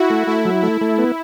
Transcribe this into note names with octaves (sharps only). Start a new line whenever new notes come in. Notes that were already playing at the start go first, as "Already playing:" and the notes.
Already playing: E4 F#4
A3
A3 E4
F#3
A3 E4
A3
B3